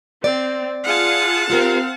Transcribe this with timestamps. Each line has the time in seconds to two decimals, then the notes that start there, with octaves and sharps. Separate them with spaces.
0.24 C4 D5
0.84 F4 G#4 F#5 A5
1.50 C4 F4 G4 A#4 F5